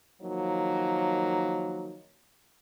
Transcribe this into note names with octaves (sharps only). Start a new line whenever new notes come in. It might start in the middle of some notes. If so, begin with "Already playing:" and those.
D#3 F3 F#3 A#3 D#4